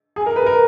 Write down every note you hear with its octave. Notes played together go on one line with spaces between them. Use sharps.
G#4
A#4
B4
A#4